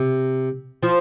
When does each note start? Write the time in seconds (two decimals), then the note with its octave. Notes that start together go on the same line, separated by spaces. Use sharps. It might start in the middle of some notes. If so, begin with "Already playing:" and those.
Already playing: C3
0.83 F3 F4